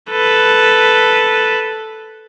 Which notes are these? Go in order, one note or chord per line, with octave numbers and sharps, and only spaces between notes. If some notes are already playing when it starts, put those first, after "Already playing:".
A4 B4